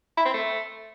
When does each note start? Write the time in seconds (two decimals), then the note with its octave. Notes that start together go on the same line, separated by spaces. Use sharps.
0.17 E4
0.25 C4
0.34 A3